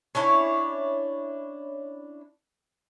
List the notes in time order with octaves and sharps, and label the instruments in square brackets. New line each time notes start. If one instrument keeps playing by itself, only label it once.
[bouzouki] C#4 D4 E4 C#5